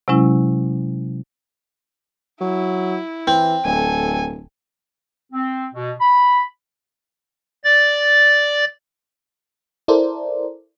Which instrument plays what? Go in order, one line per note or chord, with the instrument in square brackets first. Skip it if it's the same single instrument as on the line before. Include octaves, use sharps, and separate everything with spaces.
[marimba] C3 F#3 G#3 C#4 E4
[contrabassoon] F#3 [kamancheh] E4
[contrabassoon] E3 [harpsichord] C4
[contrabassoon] D1 [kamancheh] A4 G#5
[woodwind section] C4
B2
B5
[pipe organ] D5 A6
[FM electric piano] E4 A4 A#4 C5 D5